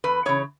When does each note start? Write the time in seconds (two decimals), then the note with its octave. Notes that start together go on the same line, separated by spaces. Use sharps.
0.04 E2 B4
0.26 C#3 E3 B3 C#5